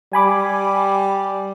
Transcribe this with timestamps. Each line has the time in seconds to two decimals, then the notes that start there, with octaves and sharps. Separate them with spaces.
0.13 G3 G#5 B5 D6